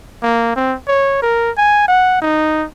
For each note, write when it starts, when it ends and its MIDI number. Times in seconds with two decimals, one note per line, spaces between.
0.22 0.53 58
0.56 0.75 60
0.87 1.18 73
1.22 1.51 70
1.57 1.88 80
1.88 2.18 78
2.22 2.65 63